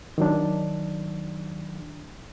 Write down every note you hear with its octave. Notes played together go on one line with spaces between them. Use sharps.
D#3 F#3 D4